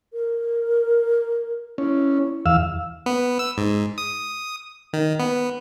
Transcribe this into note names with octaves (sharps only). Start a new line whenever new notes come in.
A#4
C#4 E4
E2 F5 E6
B3
E6
G#2
D#6
D#3
B3